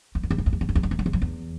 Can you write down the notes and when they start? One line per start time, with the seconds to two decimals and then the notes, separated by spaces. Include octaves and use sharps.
0.15 E2
0.23 F#2
0.30 E2
0.38 F#2
0.46 E2
0.53 F#2
0.61 E2
0.69 F#2
0.75 E2
0.83 F#2
0.91 E2
0.99 F#2
1.06 E2
1.13 F#2
1.22 E2